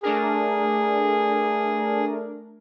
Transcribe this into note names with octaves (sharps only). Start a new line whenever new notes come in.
A3 D4 G#4 A#4